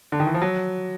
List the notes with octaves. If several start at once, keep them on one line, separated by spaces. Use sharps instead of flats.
D3
D#3
E3
F3
F#3